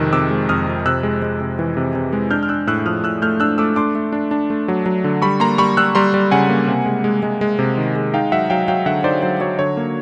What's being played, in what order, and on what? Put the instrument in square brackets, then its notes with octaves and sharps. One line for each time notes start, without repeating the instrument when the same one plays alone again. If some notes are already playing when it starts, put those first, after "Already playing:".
Already playing: [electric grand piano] F2 C3 D#3 G#3 E6 F#6
C3 D6 E6
G#3
F2 D#6 F6
F2
C3 E6 F#6
G#3
G#3
C3
E3
C3
C3
G#3
D4 F6 G6
F6
D4 E6 F#6
A2 E6 F#6
F3 D#6 F6
A2 E6 F#6
A3 F6 G6
D4 E6 F#6
A3 D6 E6
D4 C6 D6
A3
D4
D4
A3
F#3
F#3
D3
G3 B5 C#6
A#3 A#5 C6
G3 B5 C#6
G3 E6 F#6
G3 A#5 C6
G3
C#3 F#5 G#5
A#3
C3
G#3
G#3
G#3
G#3
C3
D#3
G#3
D#4 F5 G5
F#3 E5 F#5
F#3 F5 G5
F#3 F5 G5
D3 E5 F#5
D#4 C5 D5
F#3 C5
F#3 C#5
D3 C#5
A#3